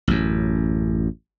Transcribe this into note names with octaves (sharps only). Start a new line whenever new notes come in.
A1 F#2